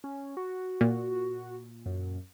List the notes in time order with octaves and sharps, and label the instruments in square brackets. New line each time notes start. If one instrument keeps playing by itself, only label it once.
[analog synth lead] C#4
F#4
[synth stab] A#2
[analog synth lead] F#2